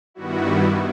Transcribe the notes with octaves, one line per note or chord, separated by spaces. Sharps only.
G2 D#3 G3 B3 E4 F#4